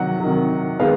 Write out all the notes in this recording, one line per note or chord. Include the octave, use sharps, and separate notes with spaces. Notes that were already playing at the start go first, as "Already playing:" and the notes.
Already playing: C3 D#3 F#3 F#5
C3 D#3 F#3
D#3 G#3 B3 F5